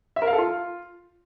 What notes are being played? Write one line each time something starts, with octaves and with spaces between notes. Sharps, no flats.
E5
A#4
F5
A4
F4